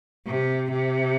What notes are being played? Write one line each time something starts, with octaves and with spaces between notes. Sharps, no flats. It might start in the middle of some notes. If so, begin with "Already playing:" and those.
C3
C3